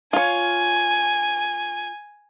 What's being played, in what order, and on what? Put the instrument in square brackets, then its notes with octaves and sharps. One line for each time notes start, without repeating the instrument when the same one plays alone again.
[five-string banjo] F4 C#5 [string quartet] G#5